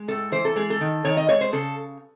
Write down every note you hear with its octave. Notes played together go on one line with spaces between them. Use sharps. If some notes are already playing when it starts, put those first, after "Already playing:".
Already playing: G#3
A2 A4
E3 C5
A4
G#3 G#4
A4
D#3
D#3 C#5
D#5
G#3 C#5
C5
C#3 A4